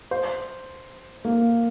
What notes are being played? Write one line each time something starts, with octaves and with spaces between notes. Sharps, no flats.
C5
A#3